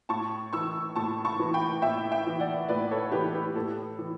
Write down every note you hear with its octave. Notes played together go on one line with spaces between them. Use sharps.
A2 A5 C#6
E3 C#6 E6
A2 A5 C#6
A5 C#6
E3
G5 B5
A2 E5 G5
E5 G5
E3
D5 F#5
A2 B4 D5
A4 C#5
E3 G4 B4
G4 B4
A2 A4
E3